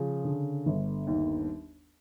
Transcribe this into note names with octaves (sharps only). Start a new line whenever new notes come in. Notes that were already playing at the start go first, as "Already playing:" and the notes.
Already playing: C#3 F3
D3
G1
D#2